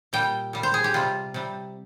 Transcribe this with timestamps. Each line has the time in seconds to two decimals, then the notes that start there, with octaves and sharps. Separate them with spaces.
0.13 A#2 G3 G5
0.53 A#2 G3
0.63 C5
0.74 G#4
0.84 G4
0.94 C3 G3 F4
1.34 C3 G3